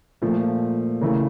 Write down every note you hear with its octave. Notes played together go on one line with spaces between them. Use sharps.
A#2 F3 A3
C#3 E3 A3 A#4